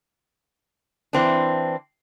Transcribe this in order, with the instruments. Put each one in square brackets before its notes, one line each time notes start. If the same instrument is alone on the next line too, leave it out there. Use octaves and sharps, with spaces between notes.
[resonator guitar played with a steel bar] E3 C4 D4